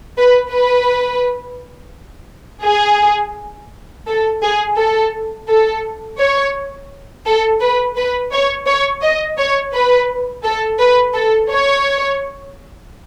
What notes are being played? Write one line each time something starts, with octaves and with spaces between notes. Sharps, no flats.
B4
B4
G#4
A4
G#4
A4
A4
C#5
A4
B4
B4
C#5
C#5
D#5
C#5
B4
A4
B4
A4
C#5